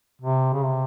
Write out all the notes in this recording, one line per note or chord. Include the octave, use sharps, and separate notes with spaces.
C3
C#3
C3